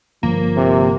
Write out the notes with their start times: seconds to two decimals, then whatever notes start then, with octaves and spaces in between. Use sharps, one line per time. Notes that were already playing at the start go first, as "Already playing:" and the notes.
0.23 G1 F3 A#3
0.56 C3